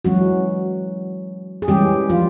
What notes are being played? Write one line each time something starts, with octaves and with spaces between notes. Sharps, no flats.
E3 F#3 G#3 C#4 F#4
G#4
E3 G3 G#3 C#4 G4
F3 F4